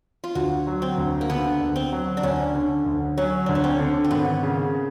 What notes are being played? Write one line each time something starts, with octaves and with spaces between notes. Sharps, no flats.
F4
D2 F#4
F#3
C4
D2
A#3
D3 B3
D2
C4
F#3
D4
D2 C#4
D3
D2
F#3 C#4
D2 D4
C#4
C4
D3
C4
G#1 B3
C#3